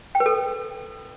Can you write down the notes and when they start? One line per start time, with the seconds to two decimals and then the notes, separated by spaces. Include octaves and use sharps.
0.15 G5
0.20 B4
0.26 A4